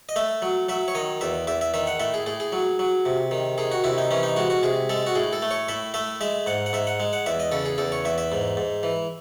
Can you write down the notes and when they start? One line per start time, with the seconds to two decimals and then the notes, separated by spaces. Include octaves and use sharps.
0.09 D#5
0.16 A3 E5
0.42 F#3
0.69 F#3 E5
0.88 C#5
0.95 D#3 D#5
1.21 E2 E5
1.47 E2 E5
1.61 E5
1.74 D#3 E5
1.87 F#5
2.00 A2 E5
2.14 G#4
2.26 A2 G#4
2.40 G#4
2.53 F#3
2.79 F#3
3.06 C3
3.31 D#3
3.58 D#3 G#4
3.72 F#4
3.84 C3 E4
3.98 D#4
4.11 E3 C#4
4.23 D#4
4.36 G#3 F#4
4.50 F#4
4.63 C3 G#4
4.89 G#3 A4
5.06 F#4
5.15 A2 G#4
5.33 A4
5.42 A3
5.51 C#5
5.69 A2 E5
5.94 A3 E5
6.21 G#3 E5
6.46 G#2 F#5
6.66 F#5
6.73 G#2 E5
6.87 F#5
7.00 G#3
7.13 F#5
7.26 E2 E5
7.40 D#5
7.52 C#3 A4
7.66 G#4
7.78 E2 A4
7.92 C#5
8.05 E2 E5
8.18 E5
8.32 G#2
8.57 G#2
8.83 E3